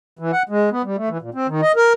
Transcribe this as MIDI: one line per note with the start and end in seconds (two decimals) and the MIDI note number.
0.19 0.31 52
0.33 0.43 78
0.49 0.70 56
0.72 0.82 59
0.84 0.96 55
0.97 1.09 57
1.09 1.18 52
1.21 1.30 46
1.34 1.47 60
1.48 1.61 51
1.62 1.72 75
1.76 1.93 70